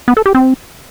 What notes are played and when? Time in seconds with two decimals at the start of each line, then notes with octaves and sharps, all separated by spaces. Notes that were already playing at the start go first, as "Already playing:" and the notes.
0.08 B3
0.17 A4
0.26 G4
0.35 C4